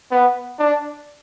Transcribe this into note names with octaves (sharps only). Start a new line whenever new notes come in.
B3
D4